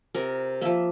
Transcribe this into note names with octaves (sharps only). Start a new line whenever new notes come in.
C3 A#4
F3 A#3 E5